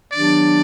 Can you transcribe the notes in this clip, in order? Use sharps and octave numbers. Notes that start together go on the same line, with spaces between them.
D#3 F#3 B3 D4 G4 D5